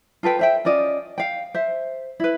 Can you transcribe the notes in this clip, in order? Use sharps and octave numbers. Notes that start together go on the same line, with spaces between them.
F4 A4 B4 G5
C5 E5 G5
C#4 F4 D5 D#5
F5 G5
C5 E5
E4 B4